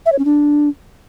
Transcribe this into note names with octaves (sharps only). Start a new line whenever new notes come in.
E5
C#5
C#4
D4